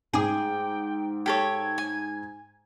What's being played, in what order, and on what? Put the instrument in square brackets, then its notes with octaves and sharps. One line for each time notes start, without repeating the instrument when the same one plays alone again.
[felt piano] G#2 D6 [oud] G#4 [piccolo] G5
[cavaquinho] G4 A4 C#5 [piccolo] G#6
[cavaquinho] G#5